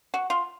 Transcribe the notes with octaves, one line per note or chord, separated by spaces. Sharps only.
F#4
F4